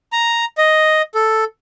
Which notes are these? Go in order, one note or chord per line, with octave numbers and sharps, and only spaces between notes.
A#5
D#5
A4